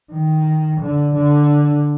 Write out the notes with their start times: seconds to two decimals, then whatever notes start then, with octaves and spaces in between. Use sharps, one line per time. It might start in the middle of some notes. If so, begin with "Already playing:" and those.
0.13 D#3
0.80 D3
1.14 D3